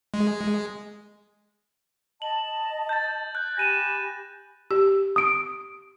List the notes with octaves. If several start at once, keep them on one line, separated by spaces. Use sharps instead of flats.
G#3
D#5 A5 F#7
G6 A6
G6
F#6 G6
G4 G#5 B5 A#6 D#7 E7
G4
D#6 D7